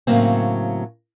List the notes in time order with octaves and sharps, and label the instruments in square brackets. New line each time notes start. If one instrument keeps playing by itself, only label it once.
[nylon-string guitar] A2 C#3 F#3 A#3 C4